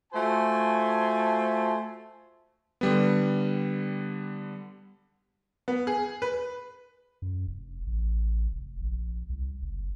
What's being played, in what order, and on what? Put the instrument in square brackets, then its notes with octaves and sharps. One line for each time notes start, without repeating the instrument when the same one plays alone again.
[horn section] A3 F4 F#4 C5 G#5 A5
[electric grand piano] D3 G3 B3
[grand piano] B3
G#4
B4
[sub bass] F#2
F1
A1
F1
A#1
C2
F#1